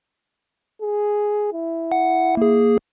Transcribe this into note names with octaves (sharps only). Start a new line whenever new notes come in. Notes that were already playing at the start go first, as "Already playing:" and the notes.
G#4
E4
F#5
A#3 G#4